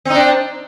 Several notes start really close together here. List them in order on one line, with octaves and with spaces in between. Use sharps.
C4 D#4 D4